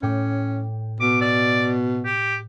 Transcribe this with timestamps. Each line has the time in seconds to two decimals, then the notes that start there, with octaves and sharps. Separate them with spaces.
0.02 A2 C#4 G5 D6
1.00 B2 D6 B6 C#7 D#7
1.21 D5 E6 A6 D#7
2.05 G4